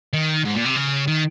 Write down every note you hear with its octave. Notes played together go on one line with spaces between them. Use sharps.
D#3
G#2
A#2
C3
C#3
D#3